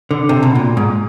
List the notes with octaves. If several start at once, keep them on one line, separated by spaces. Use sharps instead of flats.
D3
C3
B2
A#2
G#2